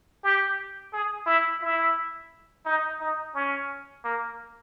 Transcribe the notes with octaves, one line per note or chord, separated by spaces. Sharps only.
G4
G#4
E4
E4
D#4
D#4
C#4
A#3